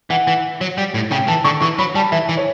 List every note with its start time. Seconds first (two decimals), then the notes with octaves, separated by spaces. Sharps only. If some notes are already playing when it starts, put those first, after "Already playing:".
0.10 E3 F#5
0.27 E3
0.61 F#3
0.78 G3
0.94 A2
1.11 C#3 G5
1.28 E3 A5
1.44 D3 C#6
1.62 E3 C#6
1.78 F#3 B5
1.95 G3 A5
2.12 E3 E5
2.29 E3
2.37 C#5